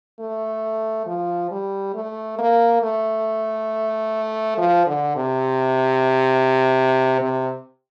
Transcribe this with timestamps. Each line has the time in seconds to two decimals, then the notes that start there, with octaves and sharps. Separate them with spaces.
0.20 A3
1.06 F3
1.51 G3
1.94 A3
2.39 A#3
2.82 A3
4.58 F3
4.86 D3
5.16 C3
7.20 C3